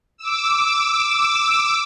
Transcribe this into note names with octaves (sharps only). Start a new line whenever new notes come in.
D6 E6